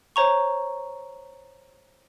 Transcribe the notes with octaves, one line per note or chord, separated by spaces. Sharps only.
C5 C#5 A#5 C#6